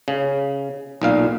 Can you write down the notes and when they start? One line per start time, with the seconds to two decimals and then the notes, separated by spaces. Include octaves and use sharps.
0.08 C#3
1.02 B1 A#2 F5